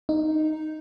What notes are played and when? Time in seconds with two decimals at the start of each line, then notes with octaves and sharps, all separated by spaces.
0.09 D#4